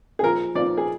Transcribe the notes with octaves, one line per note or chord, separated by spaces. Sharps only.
G#4
A#2 F3 A#4
A#2 F3 D5
G#4